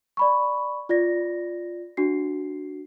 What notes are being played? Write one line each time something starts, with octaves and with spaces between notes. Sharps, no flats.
D5 B5 C#6
F4 D5 A#6
D4 F#4 C7